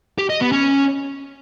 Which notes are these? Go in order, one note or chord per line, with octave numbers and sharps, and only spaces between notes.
G4
D#5
B3
C#4